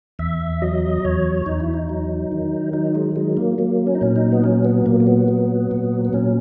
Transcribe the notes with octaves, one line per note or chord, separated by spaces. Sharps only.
E2 E5
F#3 D#5
E2 C#5
E2 D#4
E4
D#4
F#3
D#3
F#3 D#4
G#3
F#3 G#3
A#3
F#3 A#3
C#4
D#4
A#2 C#4
D#4
B3
F#3 C#4
B3
A#2 A#3
A#3
B3
F#3
A#2
B3
A#2 C#4